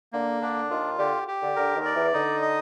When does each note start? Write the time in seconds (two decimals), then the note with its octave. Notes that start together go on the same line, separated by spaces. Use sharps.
0.13 D3 A#3
0.41 D3 D4
0.70 D#2 D#3 F4
0.99 D3 G4
1.28 G4
1.42 D3
1.56 D3 A#4
1.75 D#2 D#3
1.85 D5
1.94 E2 E3
2.14 D3 D#4
2.42 D#5